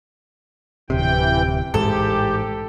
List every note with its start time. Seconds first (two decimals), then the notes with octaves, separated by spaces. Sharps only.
0.90 D1 C3 E3 G5
1.74 A1 G#2 G4 A4